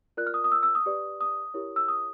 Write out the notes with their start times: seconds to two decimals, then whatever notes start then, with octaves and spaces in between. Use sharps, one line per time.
0.17 F4 A#4 D5 F#6
0.27 F6
0.34 D#6
0.44 D#6
0.52 E6
0.63 E6
0.75 D#6
0.86 G4 B4 D5
1.21 D#6
1.54 E4 G4 A#4 C#5
1.76 E6
1.88 D#6